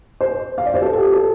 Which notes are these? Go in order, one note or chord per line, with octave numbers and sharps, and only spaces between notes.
C5
F5
D5
C5
A4
G4
A4